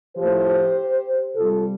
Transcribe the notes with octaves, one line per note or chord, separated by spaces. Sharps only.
A2 F3 G4 C5
C3 G3 F4 A4